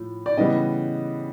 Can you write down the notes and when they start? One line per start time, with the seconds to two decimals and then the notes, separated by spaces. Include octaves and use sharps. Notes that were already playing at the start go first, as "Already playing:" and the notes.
Already playing: A2 F3
0.26 D5
0.37 C#3 E3 G3 B3 D#5